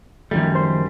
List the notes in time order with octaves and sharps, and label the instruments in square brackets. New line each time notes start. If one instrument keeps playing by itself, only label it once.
[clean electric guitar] F#2 G3 [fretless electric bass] D#3 F3 A3
[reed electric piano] C5 C6